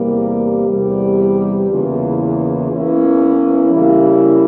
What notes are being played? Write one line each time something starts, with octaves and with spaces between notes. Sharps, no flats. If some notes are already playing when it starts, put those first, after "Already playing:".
Already playing: E2 C3 G3 A#3
E2 C3 G3
E2 C#3 E3 A#3 F4
E2 E3 A#3 C#4 E4
C#3 G3 A#3 E4